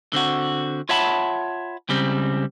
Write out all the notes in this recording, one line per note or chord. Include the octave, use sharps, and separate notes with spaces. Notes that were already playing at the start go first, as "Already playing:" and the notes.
D3 C4 F#4
F4 C#5 E5 F#5 A5 B5
C#2 C#3 G3 C4